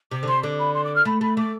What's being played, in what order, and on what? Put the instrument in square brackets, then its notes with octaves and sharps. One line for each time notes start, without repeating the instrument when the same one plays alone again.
[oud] C3 [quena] D6
[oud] D3
[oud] C3 [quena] C6
[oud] D3 [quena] D6
[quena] B5
C6
D6
F6
[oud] A3 [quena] B5
[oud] A3 [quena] B5
[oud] A3 [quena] D6